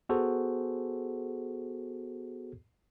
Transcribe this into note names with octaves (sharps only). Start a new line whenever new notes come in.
B3 F#4 G#4 A4 C5